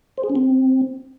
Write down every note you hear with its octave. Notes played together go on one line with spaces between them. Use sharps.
C5
G#4
C#4
C4